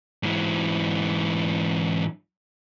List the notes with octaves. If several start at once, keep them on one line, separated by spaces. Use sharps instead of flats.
G#2 E3